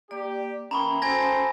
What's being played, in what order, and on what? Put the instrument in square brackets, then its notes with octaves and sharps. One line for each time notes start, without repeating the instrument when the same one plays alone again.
[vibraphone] A#3 D5 [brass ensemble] G4
[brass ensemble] E3 A#3 [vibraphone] C#4 G5 D#6 [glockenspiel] A#5 B5 C#6
[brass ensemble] F#4 A4 C5 [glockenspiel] G#5 G#6 A#6